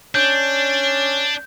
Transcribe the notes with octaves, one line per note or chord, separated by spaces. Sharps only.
C#4 D4 G6